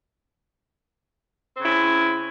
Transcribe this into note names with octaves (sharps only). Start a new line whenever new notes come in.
C#3 C4 C#4 E4